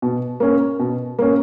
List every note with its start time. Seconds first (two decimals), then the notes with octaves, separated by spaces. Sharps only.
0.02 B2
0.40 A#3 C#4
0.79 B2
1.19 A#3 C#4